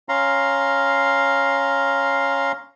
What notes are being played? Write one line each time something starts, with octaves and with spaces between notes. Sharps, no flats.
C#4 F5 A#5 C6